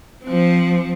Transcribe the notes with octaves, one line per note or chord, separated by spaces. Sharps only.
F3 C4